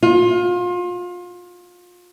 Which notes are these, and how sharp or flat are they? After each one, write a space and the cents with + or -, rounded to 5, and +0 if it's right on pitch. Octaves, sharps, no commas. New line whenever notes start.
F4 +30